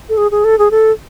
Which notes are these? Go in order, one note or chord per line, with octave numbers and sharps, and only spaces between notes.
A4
G#4
G#4
A4
G#4
A4